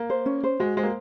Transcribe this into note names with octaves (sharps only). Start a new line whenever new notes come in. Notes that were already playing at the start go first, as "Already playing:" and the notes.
Already playing: A#3
C5
C#4
C5
G#3 F#4
G#3 C5
A#3